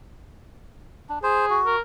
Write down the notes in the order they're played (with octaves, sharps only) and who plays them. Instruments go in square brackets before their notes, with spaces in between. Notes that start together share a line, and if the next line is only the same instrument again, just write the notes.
[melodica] D4
[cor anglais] G#4 [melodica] C5
[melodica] F#4
[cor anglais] A#4